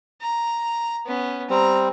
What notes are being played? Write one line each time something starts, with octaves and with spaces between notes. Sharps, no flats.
A#5
B3 C#4
G3 C4 A#5